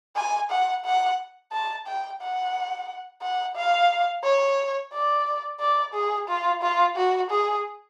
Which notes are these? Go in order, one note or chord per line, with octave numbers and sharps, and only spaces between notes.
G#5
F#5
F#5
A5
G5
F#5
F#5
F5
C#5
D5
D5
G#4
F4
F4
F#4
G#4